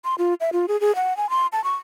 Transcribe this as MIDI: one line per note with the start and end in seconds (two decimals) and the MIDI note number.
0.05 0.15 84
0.18 0.34 65
0.40 0.50 76
0.53 0.66 65
0.68 0.79 68
0.81 0.95 68
0.95 1.16 78
1.17 1.30 80
1.30 1.47 84
1.52 1.63 81
1.64 1.75 85